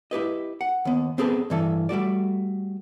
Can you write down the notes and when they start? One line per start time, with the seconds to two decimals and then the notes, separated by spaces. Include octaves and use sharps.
0.11 E4 G4 B4 D#5
0.61 F#5
0.85 D#2 B3
1.18 B3 C4 G#4 A4 B4
1.50 G2 E3 A4
1.89 G3 A3 F#4 D5